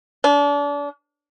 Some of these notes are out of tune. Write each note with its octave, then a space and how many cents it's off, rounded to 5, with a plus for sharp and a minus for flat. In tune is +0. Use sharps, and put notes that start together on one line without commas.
D4 -35